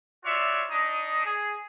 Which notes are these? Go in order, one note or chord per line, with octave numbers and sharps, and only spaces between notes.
F4 F#4 C#5 D5 E5
D4 D#4 D#5 D#6
G#4